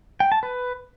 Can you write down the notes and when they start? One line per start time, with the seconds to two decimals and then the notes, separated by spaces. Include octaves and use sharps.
0.20 G5
0.32 A5
0.43 B4